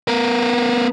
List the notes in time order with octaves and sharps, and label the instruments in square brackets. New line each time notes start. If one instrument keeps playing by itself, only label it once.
[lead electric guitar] B3 A#4